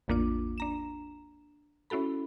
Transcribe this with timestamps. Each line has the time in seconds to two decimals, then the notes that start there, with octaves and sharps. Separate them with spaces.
0.08 A1 E2 A#3 D4 F4 D6
0.58 D4 A#5 E7
1.90 C#4 E4 F#4 A4 B5